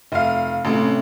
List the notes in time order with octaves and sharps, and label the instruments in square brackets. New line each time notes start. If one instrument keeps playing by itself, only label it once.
[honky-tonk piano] F1 F5 [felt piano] E5
[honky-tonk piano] A1 [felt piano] C3 A3 C#4